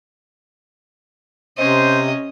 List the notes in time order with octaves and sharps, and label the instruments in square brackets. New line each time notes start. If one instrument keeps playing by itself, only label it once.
[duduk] C3 [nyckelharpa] C#4 [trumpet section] C5 [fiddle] D#5